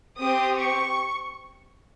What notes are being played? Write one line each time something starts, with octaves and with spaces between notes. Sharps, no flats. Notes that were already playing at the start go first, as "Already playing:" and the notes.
C4 G4 D#6
C#6